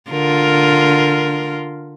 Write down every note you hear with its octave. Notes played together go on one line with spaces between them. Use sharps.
D3 F4 A#4